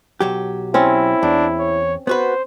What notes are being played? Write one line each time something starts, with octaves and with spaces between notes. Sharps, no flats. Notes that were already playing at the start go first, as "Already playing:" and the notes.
B1 F#3 G4
C4 C#4 E4
E2 D4
C#5
B3 F#4 B4 C5